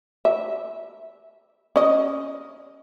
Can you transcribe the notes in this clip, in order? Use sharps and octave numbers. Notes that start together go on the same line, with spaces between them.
E5
C#4 D#5